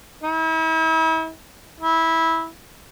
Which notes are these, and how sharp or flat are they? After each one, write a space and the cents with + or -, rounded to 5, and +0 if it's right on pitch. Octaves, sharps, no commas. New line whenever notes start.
E4 -40
E4 -15